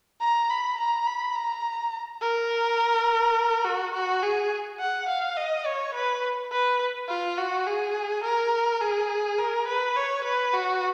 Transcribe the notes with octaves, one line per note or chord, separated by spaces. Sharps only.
A#5
B5
A#5
B5
A#5
A#4
F#4
F#4
G#4
F#5
F5
D#5
C#5
B4
B4
F4
F#4
G#4
A#4
G#4
A#4
B4
C#5
B4
F#4